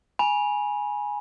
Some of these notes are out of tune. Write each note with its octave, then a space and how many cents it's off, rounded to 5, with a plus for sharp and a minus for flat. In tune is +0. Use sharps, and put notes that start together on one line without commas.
G#5 +0 B5 -35